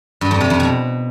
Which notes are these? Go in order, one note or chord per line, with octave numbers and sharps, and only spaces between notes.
G2
F2
C3
F2
B2